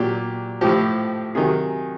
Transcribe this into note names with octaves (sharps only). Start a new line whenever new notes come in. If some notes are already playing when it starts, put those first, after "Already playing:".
Already playing: A#2 F#3 G4
A2 F3 G4
C3 D#3 F#3 G#4